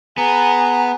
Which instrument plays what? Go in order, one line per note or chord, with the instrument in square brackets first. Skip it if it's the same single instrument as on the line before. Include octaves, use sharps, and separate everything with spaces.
[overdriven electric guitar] B3 [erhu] G#4 [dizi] A#5